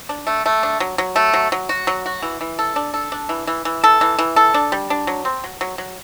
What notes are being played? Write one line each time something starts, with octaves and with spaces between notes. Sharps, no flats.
D4
A3
A3
D4
F#3
F#3
A3
F#3
F#3
F#4
F#3
F#4
E3
E3
A4
D4
A4
D4
E3
E3
E3
A4
E3
E3
A4
D4
G3
D4
F#3
C4
F#3
F#3
F#3